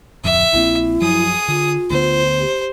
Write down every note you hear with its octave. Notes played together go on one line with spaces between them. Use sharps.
D1 F2 E5
A#1 A#2 C4 E4
F#2 F3 F#3 G#4 D#6
D3 F4
D2 D3 B3 C5
G4